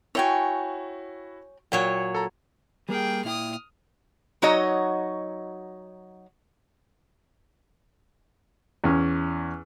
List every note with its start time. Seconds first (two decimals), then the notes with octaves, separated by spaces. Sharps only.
0.15 E4 F#4 C#5 G5 G#5
1.72 A#2 F#3 C#5 G5
2.15 A4 A#5
2.89 G3 A#3 G#4 A#4 G5
3.24 A#2 E4 G5 D#6 F6
4.42 F#3 D#4 F#4 C#5 D#5
8.84 E2 C#4